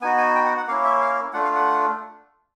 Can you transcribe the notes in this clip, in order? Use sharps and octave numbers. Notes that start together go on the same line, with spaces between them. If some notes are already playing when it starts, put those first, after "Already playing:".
B3 D#4 F#4 G#5
G#5
G5
F#5
F#5
A#3 C#4 E4 F5
E5
F5
A3 D4 F4 F#5
F5
F#5